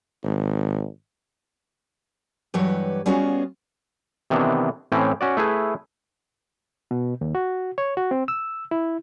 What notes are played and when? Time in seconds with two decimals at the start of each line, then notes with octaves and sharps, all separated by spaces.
0.24 G#1
2.54 G2 E3 F#3 G4 B4 C#5
3.06 G3 B3 C#4 F4 F#4 G#4
4.30 C3 D#3 E3 B3 D4
4.92 A2 E3 C4 C#4 G5
5.21 C#4 F#4 D5
5.37 A3 E4 G#4 B4
6.91 B2
7.21 D#2
7.35 F#4
7.78 C#5
7.97 F#4
8.11 C4
8.28 E6
8.71 E4